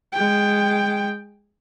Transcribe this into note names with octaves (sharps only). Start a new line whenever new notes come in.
G#3 G5